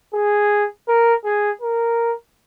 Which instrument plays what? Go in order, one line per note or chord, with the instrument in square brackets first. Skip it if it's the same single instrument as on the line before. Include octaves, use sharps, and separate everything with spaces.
[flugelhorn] G#4
A#4
G#4
A#4